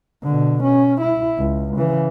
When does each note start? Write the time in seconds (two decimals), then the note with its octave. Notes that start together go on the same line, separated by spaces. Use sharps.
0.24 B2 D3
0.64 C#4
1.02 E4
1.38 C#2
1.77 C#3 E3